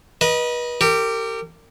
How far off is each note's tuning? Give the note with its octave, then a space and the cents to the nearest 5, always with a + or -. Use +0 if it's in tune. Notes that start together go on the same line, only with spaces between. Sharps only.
B4 -35 D#5 +0
G4 +0 A#4 -35